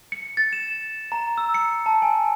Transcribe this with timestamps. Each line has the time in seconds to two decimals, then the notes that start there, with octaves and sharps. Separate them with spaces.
0.12 C#7
0.37 A6
0.53 E7
1.12 A#5
1.38 E6
1.54 C#7
1.86 A5
2.02 G#5